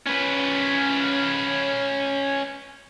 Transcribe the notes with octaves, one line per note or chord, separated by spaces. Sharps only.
C#4 B4